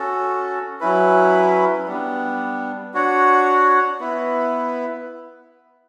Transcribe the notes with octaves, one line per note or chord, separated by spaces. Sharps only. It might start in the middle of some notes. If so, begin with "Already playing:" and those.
Already playing: C#4 F#4 A4
F#3 C#4 E4 B4
G3 B3 D4
D4 F#4 C#5 F#5
B3 E4 B4